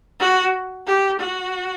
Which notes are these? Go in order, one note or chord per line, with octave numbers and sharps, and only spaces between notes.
F#4
G4
F#4